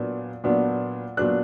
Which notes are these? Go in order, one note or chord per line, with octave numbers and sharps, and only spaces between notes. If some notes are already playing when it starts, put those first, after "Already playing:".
Already playing: A#2 F#3 B3 D4
A#2 F#3 B3 D4
A#2 F#3 B3 D4 F#6